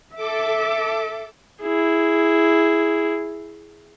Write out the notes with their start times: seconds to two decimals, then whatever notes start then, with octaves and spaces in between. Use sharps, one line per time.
0.15 A4 E5 D6
1.61 E4 G#4